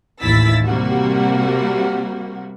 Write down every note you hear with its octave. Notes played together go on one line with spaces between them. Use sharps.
A1 D#2 E4 E6 A6 B6
C3 G3 A#3 F#4